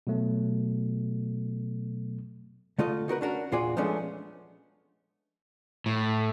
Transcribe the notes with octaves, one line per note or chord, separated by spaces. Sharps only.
B2 F#3 A3
D3 A3 F4 D#5
D#4 F#4 A#4 B4
C#4 D4 F#4 A#4
E2 A#2 F4 F#4 D5 G#5
F3 G#3 A3 B3 C#4 D4
A2